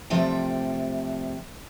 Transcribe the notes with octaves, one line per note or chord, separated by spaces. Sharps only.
C3 F3 G3 A3 G5